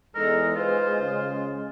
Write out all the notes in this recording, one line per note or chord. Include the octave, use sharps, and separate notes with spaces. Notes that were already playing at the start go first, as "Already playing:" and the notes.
E2 G#3 D#4 A4 A#4
F4 B4 C5
C#3 F4